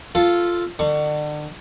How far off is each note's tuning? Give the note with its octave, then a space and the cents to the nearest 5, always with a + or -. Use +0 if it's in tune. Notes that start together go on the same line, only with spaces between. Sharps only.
F4 -5 A4 +0
D3 +35 C#6 +15